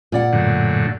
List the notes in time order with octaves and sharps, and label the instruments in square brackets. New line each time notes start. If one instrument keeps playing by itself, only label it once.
[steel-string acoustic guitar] A#2 D5 F#5
[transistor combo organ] F#2 A2 D3